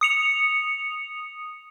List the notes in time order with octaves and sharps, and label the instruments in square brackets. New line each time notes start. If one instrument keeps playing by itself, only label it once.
[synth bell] D#6 C#7 F7